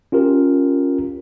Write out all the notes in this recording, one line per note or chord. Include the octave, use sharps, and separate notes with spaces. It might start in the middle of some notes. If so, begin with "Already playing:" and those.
C#4 F4 G4 A#4